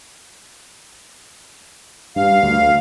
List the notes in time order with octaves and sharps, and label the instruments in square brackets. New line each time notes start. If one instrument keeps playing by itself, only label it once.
[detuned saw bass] G2 [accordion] F5
[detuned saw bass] D2